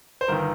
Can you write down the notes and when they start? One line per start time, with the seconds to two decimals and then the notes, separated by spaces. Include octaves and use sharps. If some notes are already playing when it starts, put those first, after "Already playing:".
0.21 C5
0.28 G1 D#3 A#4